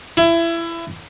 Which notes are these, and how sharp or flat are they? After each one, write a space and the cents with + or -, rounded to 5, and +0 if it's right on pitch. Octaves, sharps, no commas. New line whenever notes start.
E4 +25